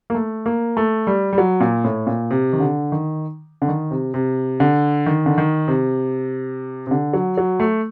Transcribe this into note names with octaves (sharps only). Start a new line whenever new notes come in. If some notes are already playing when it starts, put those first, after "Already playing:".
A#3
A3
A#3
A3
G3
G3
F#3
A#2
A2
A#2
C3
D#3
D3
D#3
D3
D#3
C3
C3
D3
D#3
D3
D#3
C3
C3
D3
F#3
F#3
A3